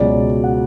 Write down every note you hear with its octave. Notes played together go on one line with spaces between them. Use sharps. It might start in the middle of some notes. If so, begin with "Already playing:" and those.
Already playing: C#2 B2 F#3 D5
F#5